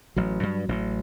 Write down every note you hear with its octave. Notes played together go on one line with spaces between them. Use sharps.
A1 F#3
G2
A1